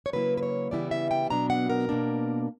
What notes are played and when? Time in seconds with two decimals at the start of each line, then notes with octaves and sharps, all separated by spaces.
0.06 C#5
0.13 C#3 F#3 A#3 E4 B4
0.37 B4
0.43 C#5
0.71 C#3 E3 G3 B3 E4 D5
0.91 E5
1.11 G5
1.30 B2 F#3 B3 D4 A#5
1.50 F#5
1.70 A#4
1.89 B2 A#3 D4